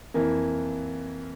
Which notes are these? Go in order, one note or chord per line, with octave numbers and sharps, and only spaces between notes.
F2 E3 A#3